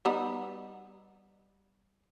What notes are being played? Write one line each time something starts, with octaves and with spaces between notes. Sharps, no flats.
G3 B3 D#4